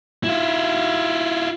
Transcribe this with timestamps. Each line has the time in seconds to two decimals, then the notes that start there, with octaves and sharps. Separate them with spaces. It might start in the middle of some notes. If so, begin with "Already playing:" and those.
0.24 E4 F4